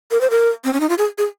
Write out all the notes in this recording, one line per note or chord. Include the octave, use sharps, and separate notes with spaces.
A#4
C5
A#4
C4
C#4
D#4
F4
G#4
G#4